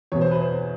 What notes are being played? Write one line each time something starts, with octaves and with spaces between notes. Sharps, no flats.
E2 B2 C#5
C5
B4
C5